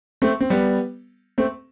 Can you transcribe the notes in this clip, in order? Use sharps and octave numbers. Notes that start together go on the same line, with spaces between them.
A3 C4
C4
G3 B3
A3 C4